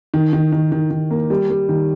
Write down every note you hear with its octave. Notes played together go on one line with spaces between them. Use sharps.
D#3
D#3
D#3
D#3
D#3
A#3
G3
G3
D#3